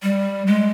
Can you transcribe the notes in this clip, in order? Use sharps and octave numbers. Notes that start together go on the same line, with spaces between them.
G3
G#3